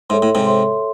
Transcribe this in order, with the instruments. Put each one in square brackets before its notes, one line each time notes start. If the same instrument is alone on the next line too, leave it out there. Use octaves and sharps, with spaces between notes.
[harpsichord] G#2 [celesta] A4 C#5 E5 C6
[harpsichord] A2
G#2 C3
[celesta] A4 C#5 E5 C6